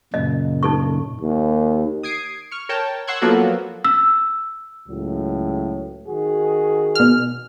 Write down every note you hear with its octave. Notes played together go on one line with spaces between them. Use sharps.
F#2 A#2 C#3 D#5
D#4 A4 C#6
D#2
D#6 G#6 C7 D7
C#6 F6
A#4 C#5 G5 A5
F#5 C6 C#6 E6 F#6 G#6
F3 F#3 A#3 B3 F#4 A4
E6
C#2 A2 F#3
D#3 F#4 G#4
B2 F6